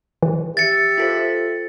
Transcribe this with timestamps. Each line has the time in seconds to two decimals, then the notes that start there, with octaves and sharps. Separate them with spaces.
0.23 E3
0.57 G4 E5 A6 C#7
0.98 F4 A4 C5